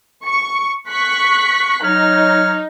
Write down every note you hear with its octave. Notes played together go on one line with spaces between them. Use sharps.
C#6
C#6 F#6 B6
F#3 D#4 C#5 F6